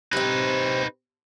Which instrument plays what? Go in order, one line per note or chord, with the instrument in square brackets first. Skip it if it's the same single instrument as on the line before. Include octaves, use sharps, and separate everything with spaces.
[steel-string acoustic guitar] C3 C4 [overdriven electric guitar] D#4 B4